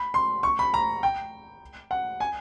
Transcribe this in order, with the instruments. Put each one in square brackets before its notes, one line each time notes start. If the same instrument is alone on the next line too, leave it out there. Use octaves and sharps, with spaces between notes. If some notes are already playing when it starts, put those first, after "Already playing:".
Already playing: [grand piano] B5
C6
C#6
B5
A#5
G5
F#5
G#5